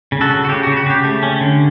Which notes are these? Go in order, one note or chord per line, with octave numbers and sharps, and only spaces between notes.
C#3
F#4 A4
C#3
F#4
C#3 G4
C#3 F#4
F#4
C#3 G4
A3
C#4
D3